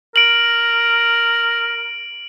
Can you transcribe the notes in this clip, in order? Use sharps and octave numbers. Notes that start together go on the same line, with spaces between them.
A#4 D7 F#7